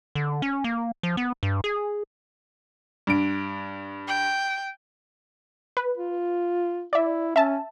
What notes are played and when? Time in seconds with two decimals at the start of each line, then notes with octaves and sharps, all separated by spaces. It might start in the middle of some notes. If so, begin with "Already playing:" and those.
0.15 D3
0.42 C#4
0.64 A#3
1.03 F3
1.17 B3
1.43 G2
1.64 G#4
3.07 G2 D7
4.08 G5
5.77 B4
5.97 F4
6.93 E4 D5 E5
7.36 C#4 E5 A5